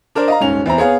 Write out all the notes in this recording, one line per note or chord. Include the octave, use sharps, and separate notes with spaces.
D4 A#4 C5 D5
D#5 F5 A#5
D#1 G#2 C#4 F7
E2 C4 E4 A#5
B3 G#4 C#5 F5